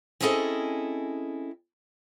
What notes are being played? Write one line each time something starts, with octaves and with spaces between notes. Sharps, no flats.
C4 C#4 E4 G#4 A4 D#5